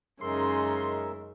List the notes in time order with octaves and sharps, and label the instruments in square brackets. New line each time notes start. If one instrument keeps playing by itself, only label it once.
[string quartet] F#2 C#3 D#4 [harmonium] G#3 A#4 E5 [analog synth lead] C6